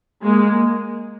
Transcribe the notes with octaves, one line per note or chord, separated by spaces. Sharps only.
G#3 A#3